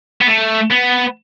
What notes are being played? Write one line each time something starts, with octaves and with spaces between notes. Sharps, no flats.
B3
A3
B3